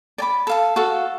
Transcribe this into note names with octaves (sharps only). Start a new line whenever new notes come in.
D5 G#5 B5 D6
A4 F5 A5
F#4 A4 F5